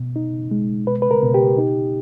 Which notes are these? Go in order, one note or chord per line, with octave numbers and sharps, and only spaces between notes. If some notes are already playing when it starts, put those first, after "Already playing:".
Already playing: B2
D#4
G#3
B2 B4
B4
A#4
B2
G4
D#4